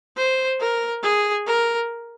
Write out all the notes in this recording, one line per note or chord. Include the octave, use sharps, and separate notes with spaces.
C5
A#4
G#4
A#4